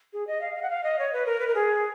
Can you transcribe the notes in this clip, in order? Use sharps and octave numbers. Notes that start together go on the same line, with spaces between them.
G#4
D#5
F5
F5
F#5
F5
D#5
C#5
B4
A#4
B4
A#4
G#4